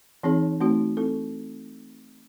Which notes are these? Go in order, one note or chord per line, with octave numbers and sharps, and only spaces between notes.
E3 C4 D#4 G#4 C#5
A3 C4 D#4 F#4
C4 E4 A4